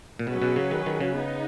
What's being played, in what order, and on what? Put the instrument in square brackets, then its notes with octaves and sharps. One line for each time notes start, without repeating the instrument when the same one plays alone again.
[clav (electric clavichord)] A#2
[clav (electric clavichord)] B2 [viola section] F#3 C#4 G#4 B4
[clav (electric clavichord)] B2
C#3
D#3
D#3
C#3
[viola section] B3 D#4